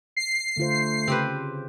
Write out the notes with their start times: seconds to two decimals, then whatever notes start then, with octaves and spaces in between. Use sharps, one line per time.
0.17 C7
0.57 D3 A3 F4 C5
1.08 C#3 C4 G4 B4